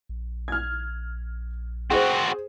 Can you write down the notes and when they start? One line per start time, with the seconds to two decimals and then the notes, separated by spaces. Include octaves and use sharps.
0.09 A#1
0.48 F6 G#6
1.91 C4 F#4 G#4 C5